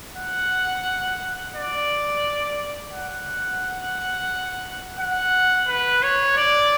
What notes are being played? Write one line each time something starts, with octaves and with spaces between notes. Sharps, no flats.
F#5
D5
F#5
F#5
B4
C#5
D5